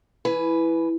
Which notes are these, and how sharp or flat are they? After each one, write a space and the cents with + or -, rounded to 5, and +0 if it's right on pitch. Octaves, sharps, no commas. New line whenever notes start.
E3 +0 B4 +0 G#5 +20